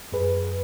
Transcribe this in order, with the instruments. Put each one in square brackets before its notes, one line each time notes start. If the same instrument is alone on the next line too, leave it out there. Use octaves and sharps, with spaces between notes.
[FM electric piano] F#2 G#4 B4